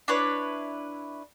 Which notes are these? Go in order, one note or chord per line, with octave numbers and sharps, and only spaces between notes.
D4 E4 B4 C#5